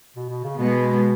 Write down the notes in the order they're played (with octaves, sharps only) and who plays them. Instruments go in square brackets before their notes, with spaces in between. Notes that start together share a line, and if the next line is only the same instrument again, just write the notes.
[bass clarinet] B2
B2
C#3
[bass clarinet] B2 [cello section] G#3 B3